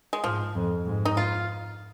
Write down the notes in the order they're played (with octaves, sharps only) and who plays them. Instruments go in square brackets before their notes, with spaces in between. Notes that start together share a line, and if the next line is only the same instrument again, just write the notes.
[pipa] G#3
[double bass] G#2 [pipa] F3
[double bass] F2
G#2
[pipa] D#4
F4